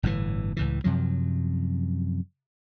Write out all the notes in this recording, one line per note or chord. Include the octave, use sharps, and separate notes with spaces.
G1 A2 C#3 E3
C#2 A2 E3
F#2 C3 F3 F#3